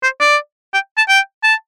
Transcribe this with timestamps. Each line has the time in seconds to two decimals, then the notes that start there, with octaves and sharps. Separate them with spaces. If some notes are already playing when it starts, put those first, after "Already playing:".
0.03 C5
0.21 D5
0.74 G5
0.97 A5
1.09 G5
1.43 A5